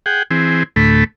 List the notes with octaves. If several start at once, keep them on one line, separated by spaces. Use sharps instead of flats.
G#4 F#5 G5
E3 C4 G#4
D2 A2 A3 B5